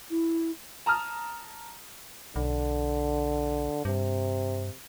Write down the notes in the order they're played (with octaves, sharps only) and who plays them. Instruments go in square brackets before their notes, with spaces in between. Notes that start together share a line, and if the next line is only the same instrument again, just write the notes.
[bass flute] E4
[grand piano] A5 A#5 D#6 F6
[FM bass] B1 [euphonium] D3
[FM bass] G2 [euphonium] C3